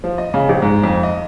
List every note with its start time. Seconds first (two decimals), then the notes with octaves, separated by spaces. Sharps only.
0.04 F3
0.18 D#5
0.34 C#3
0.49 A#1
0.62 G#2
0.83 F2
1.03 D#5